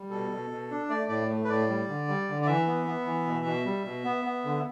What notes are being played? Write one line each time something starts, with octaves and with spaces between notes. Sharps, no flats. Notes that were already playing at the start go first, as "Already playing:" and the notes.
Already playing: G3
B2 A4
B2
B2
D4
A3 D5
A2 D5
A3
B4
A2 D5
G3
D3
G3
D3
D5
E3 E5
B3
B3
E3
B2
B2
G3
B2
B3
B3
D3